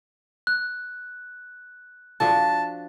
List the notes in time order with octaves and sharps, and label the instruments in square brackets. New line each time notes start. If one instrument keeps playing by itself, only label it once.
[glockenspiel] F#6
[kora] F3 D4 F#4 [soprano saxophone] A5